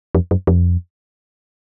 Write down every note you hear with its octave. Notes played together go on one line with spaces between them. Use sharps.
F2
F#2
F2